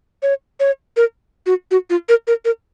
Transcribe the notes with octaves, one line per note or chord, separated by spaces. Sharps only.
C#5
C#5
A#4
F#4
F#4
F4
A#4
A#4
A#4